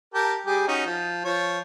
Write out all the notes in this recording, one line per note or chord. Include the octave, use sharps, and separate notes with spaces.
G4 A#4 A5
G3 G4 G#4
C#4 D#4 F#4
F3
F3 C#5